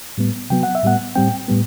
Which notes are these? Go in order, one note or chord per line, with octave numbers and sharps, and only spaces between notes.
A2 G3 B3
C3 F#3 B3 G5
F#5
E5
A2 G3 B3 F#5
A2 G3 C4 G5
A2 G3 B3